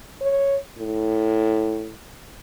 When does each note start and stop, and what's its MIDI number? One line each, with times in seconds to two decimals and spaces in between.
0.21 0.56 73
0.78 1.94 45